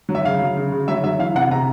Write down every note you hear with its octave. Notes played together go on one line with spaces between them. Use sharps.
F#3
E5
C#3 F5
F#3
C#3
C#3
F#3 E5
F#3 E5
E3 F5
C3 F#5
C3 A#5